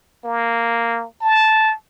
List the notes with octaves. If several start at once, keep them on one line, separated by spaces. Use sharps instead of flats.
A#3
A5